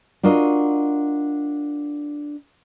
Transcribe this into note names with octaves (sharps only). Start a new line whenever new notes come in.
D4 F4 F#4 A#4 D#5